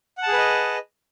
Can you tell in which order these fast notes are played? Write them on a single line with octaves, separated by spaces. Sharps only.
F#5 A5 G#4 B4 D#5